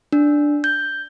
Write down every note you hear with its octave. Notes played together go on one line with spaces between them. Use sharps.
D4
G6